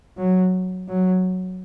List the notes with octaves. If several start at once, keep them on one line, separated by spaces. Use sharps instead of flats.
F#3
F#3